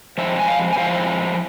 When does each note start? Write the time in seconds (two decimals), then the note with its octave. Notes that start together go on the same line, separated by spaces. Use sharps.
0.18 F3 G#3 C4 E4 E5
0.40 G#5
0.48 F5
0.73 G#5
0.78 F3 G#3 C4 E4 F5